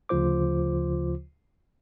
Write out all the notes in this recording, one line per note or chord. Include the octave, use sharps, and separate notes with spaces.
D2 C#3 F3 F4 C5 D6